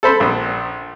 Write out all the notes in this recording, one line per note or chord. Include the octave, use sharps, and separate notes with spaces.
A4 C5 B5
A#1